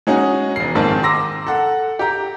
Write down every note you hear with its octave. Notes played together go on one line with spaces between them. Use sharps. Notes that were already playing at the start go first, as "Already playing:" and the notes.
G#3 C#4 D#4 F#4
E1 C7
A#1 G#2 D#3 C4 A5
A#5 C6 D6 E6 A#6
A4 F#5
G4 A#5